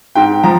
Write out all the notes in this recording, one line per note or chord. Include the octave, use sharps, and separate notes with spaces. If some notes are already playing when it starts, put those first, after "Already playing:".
G#2 G5
F3 A#5